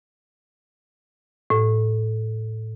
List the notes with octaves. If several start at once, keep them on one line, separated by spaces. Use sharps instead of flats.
A2